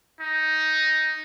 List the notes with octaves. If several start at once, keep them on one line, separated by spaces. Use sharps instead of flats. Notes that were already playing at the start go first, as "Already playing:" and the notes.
D#4